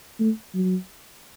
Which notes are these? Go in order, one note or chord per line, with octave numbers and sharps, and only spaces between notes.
A3
F#3